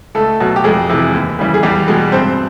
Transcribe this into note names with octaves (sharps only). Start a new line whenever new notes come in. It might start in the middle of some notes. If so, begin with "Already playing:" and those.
C#2 A3 A4
B2 F#3
G4
F2 G#3 G#4
C3 E3 G#3
D#2
C#3 E3 G3
G#4
E2 G3 G4
B2 G#3
G2 C4 C5